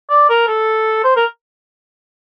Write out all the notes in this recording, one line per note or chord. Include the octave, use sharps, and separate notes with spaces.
D5
A#4
A4
C5
A#4